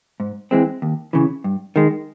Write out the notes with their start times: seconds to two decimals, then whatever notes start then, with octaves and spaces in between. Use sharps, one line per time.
0.20 G#2
0.51 E3 G#3 C4
0.82 D#2
1.13 C#3 E3
1.44 G2
1.76 D#3 G#3